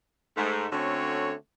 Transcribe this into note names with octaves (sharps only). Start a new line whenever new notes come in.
G#2 A3
D3 A3 C4 C#4 F#4 C#5